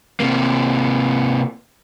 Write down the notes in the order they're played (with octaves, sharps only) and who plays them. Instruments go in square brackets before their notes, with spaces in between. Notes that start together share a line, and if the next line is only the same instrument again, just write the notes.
[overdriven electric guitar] C3 A#3